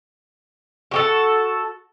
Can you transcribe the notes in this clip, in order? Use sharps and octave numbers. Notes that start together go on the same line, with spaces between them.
F#4 G4 A4